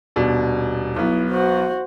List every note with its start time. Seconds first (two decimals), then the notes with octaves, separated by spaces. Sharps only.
0.16 D#1 B2 D4
0.96 B1 B3 E4
1.30 F#4 C5